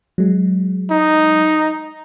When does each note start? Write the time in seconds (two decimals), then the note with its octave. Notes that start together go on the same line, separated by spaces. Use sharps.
0.18 F#3 G#3
0.91 D#4